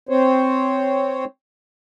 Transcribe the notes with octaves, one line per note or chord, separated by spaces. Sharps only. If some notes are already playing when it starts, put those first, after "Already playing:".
C4 C5 C#5